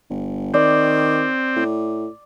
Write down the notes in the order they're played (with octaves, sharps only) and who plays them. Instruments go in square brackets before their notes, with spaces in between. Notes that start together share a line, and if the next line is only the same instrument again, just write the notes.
[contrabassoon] G1
[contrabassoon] D#3 [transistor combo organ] C4 [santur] D5
[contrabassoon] A2